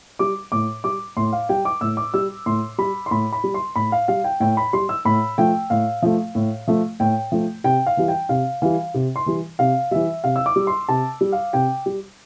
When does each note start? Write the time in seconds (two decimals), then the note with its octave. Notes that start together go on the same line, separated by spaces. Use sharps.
0.19 G3 D6
0.52 A2 D6
0.84 G3 D6
1.17 A2 C6
1.33 F5
1.49 G3 G5
1.65 D6
1.81 A2 E6
1.97 D6
2.14 G3 E6
2.46 A2 C6
2.78 G3 B5
3.06 C6
3.11 A2 B5
3.33 B5
3.44 G3
3.54 C6
3.76 A2 B5
3.92 F5
4.08 G3 F5
4.24 G5
4.40 A2 G5
4.57 B5
4.73 G3 C6
4.89 E6
5.05 A2 B5
5.38 F3 A3 G5
5.70 A2 F5
6.02 F3 A3
6.35 A2
6.68 F3 A3
7.00 A2 G5
7.32 F3 A3
7.64 C3 G5
7.87 F5
7.97 E3 G3
8.08 G5
8.29 C3 F5
8.62 E3 G3 F5
8.94 C3
9.16 C6
9.26 E3 G3
9.59 C3 F5
9.91 E3 G3 E5
10.24 C3 F5
10.36 E6
10.46 D6
10.56 G3
10.67 C6
10.89 C3 A5
11.21 G3
11.32 F5
11.53 C3 G5
11.86 G3